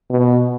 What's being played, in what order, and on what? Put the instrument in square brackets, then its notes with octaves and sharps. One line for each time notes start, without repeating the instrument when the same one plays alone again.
[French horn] B2